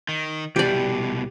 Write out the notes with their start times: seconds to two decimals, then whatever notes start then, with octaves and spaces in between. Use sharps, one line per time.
0.09 D#3
0.56 C2 B2 G4 D5